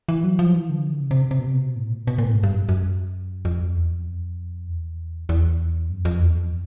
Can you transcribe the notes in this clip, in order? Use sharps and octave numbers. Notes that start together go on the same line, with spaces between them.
E3
F#3
F3
E3
D3
C#3
C3
C3
B2
C3
B2
A2
A#2
B2
A#2
A2
G#2
G2
F#2
F#2
F2
E2
F2
E2
E2
F#2
F2
E2
F2